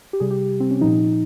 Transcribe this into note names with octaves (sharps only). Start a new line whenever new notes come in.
G4
C3 G3 G#4
G4
C4
C#4
A#2 F3 D#4